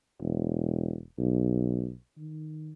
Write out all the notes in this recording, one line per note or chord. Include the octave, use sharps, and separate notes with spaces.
E1
B1
D#3